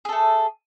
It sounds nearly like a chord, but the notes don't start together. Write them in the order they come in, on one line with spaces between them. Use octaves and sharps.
G#4 A4 A3